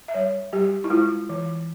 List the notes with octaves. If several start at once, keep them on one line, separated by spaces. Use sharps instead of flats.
E5
G3 C#5
G3 G4
E4
G#3 F4
E3